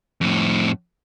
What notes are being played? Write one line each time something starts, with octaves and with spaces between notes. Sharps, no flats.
F2 A2